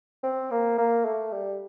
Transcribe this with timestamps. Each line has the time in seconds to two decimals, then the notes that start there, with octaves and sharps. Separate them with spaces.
0.23 C4
0.51 A#3
0.78 A#3
1.05 A3
1.32 G3